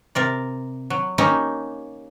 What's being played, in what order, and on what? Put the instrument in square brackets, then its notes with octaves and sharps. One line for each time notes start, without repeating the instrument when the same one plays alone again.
[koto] C3 A#4 D5
F#3
A#3 C#4 D#4 G4